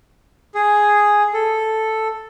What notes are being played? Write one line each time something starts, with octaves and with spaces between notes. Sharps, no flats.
G#4
A4